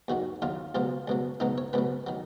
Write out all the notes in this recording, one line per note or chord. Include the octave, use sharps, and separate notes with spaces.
D#2 D#3 F#3 F#4
D#2 D#3 F#3 F4
C#2 B2 F#3 F4
C#2 B2 F#3
C#2 B2 F#3 D#4
C#5
C#2 B2 F#3 B4
D#3 F#3